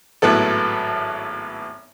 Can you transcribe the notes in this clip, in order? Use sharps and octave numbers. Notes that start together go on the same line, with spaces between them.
G#1 A2 F#3 B3 A4